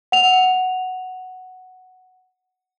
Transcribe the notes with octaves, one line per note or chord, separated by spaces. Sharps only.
F#5 F7